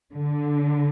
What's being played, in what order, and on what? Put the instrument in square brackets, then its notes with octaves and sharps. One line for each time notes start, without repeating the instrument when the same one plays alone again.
[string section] D3